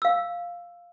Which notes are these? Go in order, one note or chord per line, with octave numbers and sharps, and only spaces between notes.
F5 E6